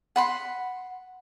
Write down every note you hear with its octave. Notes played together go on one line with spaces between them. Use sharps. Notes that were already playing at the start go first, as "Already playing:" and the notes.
F#5 B5 C6